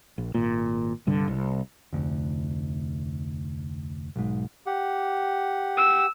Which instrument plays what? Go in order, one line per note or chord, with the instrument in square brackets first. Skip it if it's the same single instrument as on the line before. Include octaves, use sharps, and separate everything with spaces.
[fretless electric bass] A#1
G#1 A#2
C2 G2 D3
C2
[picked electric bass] F1 D2
B1 G#2
[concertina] G4 F#5
[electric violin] E6